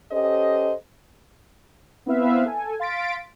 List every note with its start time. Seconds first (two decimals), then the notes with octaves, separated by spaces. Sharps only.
0.12 C#4 G4 A4 C5 D#5
2.06 B3 C4 E4 B4 E5 F5
2.46 A4 G#5
2.80 F5 C6 A6 B6 D7